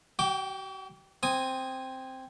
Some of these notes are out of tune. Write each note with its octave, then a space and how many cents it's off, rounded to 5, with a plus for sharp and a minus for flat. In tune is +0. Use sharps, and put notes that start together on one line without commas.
F#4 +45 G5 +0 D6 -10
C4 +0 G#5 -10 D#6 +0